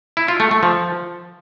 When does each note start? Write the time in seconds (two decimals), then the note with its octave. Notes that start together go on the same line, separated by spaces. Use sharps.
0.17 E4
0.28 F4
0.40 A3
0.51 A3
0.63 F3